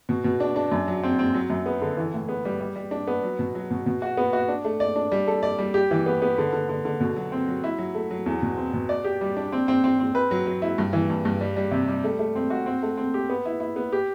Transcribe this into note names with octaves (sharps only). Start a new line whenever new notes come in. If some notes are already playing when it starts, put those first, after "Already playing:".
B2
B2
D4
D4
F#2
F#3
C4
C4
F#3
F#2
B3
D3
E3
A2
B3
G3
G3
G3
D4
B3
F#3
B2
F#3
B2
B2
F#4
B3
F#4
D4
A3
D5
D4
G3
A4
D5
G3
G4
E3
B3
B3
D3
D3
D3
D3
B2
F#3
C4
F#3
E4
F#3
A3
F#3
E2
B2
C4
B2
D5
G4
G3
D4
C4
C4
C4
C4
B4
F#3
F#3
E4
G2
E3
G2
G2
G3
G3
C3
G3
A3
A3
C4
F#4
C4
A3
C4
G4
B3
E4
E4
B3
G4